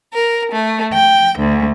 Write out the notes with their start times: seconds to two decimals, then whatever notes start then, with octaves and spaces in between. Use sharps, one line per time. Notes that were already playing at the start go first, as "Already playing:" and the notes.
0.13 A#4
0.52 A3
0.92 G5
1.38 D2